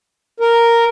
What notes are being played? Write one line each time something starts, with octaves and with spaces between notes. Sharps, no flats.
A#4